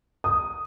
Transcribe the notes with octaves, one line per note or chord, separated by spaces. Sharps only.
D#6